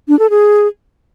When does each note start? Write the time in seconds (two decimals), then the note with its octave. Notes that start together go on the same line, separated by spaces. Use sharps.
0.08 D4
0.19 A4
0.30 G#4